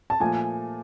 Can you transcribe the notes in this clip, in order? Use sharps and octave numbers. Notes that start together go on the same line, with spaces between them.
A5
A#2 F3 A3 G#5